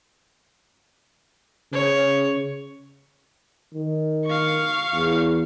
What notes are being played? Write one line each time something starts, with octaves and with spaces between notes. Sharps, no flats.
C#3 C#5
D#3
F5 C#6
E2